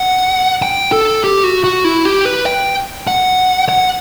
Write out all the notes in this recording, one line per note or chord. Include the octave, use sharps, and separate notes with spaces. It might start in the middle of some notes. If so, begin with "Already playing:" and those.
Already playing: F#5
G5
A4
G4
F#4
F#4
E4
G4
B4
G5
F#5
F#5